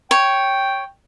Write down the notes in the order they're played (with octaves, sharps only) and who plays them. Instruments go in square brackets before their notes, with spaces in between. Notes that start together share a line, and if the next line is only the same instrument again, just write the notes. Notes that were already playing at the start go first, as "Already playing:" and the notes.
[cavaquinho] C#5 [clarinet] G5